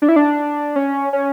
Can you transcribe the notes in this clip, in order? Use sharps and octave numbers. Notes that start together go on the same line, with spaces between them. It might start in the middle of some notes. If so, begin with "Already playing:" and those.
D4
E4
D4
C#4
C#4